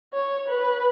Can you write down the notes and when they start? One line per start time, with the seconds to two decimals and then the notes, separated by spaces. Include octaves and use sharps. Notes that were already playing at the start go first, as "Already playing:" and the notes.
0.14 C#5
0.49 B4